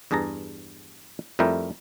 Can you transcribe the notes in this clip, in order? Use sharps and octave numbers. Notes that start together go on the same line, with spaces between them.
E2 G2 G#4 A5 A#5
F2 G3 A3 E4 A#4 G5